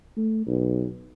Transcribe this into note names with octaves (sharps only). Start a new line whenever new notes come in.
A3
B1